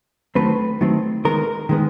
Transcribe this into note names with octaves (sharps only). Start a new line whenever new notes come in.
D#3 F#3 A3 C4 B4
D#3 F#3 A3 C4
D#3 G#3 B3 A#4
D#3 G#3 B3